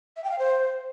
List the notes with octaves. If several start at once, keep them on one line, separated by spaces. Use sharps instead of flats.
E5
G5
F5
C5